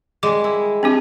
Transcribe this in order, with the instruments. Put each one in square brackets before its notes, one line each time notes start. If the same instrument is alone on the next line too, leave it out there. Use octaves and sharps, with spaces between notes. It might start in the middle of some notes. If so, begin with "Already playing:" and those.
[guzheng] G3 G#3 [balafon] D6
[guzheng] E4
[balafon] C4 D4 G4